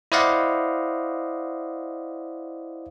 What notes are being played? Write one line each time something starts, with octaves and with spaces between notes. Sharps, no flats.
E4 C5 D5 D#5 F5 F#5